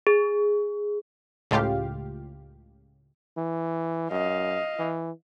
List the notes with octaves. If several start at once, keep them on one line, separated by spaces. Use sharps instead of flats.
G#4
C#2 A2 F4 G4 F5
E3
F#2 D#5 F5
E3